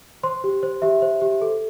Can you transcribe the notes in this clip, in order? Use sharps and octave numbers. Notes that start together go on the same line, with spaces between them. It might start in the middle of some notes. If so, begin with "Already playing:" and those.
C5 C6
G4
C5
G4 E5
C5
G4
A4